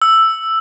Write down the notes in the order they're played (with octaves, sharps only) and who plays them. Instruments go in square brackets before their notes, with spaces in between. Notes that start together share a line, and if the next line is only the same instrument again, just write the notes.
[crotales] E6